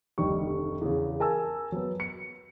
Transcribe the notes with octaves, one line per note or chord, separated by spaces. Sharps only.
F1 D2 D#3 G3 C#6
E2 C#3
G#4 A#4 G#5 A5 E6
F#3 B3
C#7